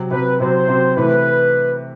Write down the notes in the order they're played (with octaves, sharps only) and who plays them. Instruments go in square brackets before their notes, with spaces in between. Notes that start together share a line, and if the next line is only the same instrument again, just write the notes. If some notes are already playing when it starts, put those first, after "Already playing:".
Already playing: [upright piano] C3 F#3 C4
[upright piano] C3 F#3 C4 [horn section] B4
[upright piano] C3 F#3 C4 [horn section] C5
[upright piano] C3 F#3 C4
[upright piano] C3 E3 A3 [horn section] B4